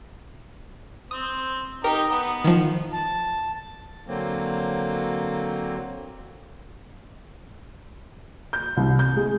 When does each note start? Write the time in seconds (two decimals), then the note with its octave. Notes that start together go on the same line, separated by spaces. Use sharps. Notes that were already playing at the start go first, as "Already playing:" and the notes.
1.11 C4 D#6
1.84 D#4 G4 A#4
2.11 B3
2.44 D#3 F3
2.93 A5
4.07 D3 F#3 A#3 C4
8.53 G6
8.77 C2
8.99 G6
9.17 G#3